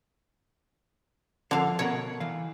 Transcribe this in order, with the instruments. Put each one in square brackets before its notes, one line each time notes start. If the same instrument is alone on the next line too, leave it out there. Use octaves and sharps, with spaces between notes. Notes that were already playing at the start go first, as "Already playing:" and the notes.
[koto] D3 F5 [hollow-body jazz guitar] F3
[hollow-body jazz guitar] B2 A#4 F#5 [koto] C#5
[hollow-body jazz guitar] E3 F5